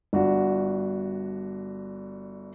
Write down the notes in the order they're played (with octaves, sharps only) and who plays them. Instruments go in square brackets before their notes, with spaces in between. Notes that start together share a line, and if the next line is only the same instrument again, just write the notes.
[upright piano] G1 D4 F#4